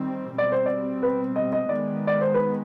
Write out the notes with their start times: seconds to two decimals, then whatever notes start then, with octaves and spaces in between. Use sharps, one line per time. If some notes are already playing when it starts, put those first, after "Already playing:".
Already playing: D#3 G3 C4
0.38 B2 G3 C4 D5
0.52 C5
0.66 D5
1.03 B4
1.36 D#5
1.53 D#5
1.69 D#3 G#3 B3 D5
2.07 D5
2.21 C5
2.34 B4